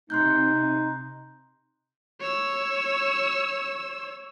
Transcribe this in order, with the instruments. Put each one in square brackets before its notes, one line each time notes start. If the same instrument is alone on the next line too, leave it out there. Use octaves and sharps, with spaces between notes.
[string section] C3 [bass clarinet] D#4 [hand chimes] C6 F#6 G6
[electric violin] C#5 E6